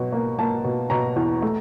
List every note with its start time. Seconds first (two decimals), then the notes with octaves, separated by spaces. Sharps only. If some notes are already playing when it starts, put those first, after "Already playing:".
Already playing: B2 F#3
0.12 A#3
0.39 A#3 A5
0.64 B2
0.90 B2 A#5
1.16 E2
1.42 A3